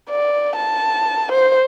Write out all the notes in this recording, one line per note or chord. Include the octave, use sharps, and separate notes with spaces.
D5
A5
C5